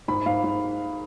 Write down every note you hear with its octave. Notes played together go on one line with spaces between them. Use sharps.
G#2 B5
G#2 F5
G#2